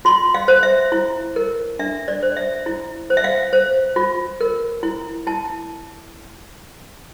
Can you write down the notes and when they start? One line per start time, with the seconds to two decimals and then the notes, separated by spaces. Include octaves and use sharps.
0.05 F4 C6
0.34 F5
0.48 C5
0.63 E5
0.92 E4
1.36 A#4
1.79 D4 E5
2.08 D5
2.23 C5
2.32 D5
2.36 E5
2.66 E4
3.10 C5
3.17 E5
3.24 F5
3.53 C5
3.96 F4
4.41 A#4
4.83 E4
5.27 E4 A5